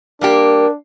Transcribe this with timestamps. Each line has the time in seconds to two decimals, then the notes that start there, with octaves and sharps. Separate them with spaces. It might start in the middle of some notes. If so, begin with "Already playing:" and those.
0.21 G3 A#3 D4 G4 A#4